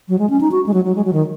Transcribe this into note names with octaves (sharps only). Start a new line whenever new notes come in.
F#3
G#3
C#4
D#4
F#4
G#3
F#3
F#3
G#3
F#3
D#3